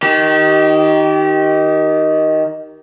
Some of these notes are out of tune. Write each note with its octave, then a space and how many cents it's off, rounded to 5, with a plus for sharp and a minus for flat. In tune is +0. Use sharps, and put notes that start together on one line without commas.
D#3 +5 G4 -30